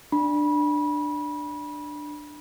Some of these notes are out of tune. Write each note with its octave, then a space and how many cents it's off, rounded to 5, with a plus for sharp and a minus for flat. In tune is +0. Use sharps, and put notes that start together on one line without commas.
D4 +15 B5 -25